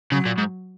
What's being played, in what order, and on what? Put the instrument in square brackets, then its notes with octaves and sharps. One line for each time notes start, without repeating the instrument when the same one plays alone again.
[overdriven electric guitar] C#3 [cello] F#3
[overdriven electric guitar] A#2
G#2